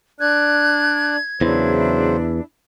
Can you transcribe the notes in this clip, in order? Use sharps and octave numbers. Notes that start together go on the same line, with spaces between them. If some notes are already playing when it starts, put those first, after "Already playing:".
D4 D5 F#6 G#6
E2 C#3 E3 F#3 D4 E4 C5